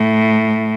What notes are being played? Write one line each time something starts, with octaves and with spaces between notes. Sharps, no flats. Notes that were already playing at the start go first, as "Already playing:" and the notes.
Already playing: A2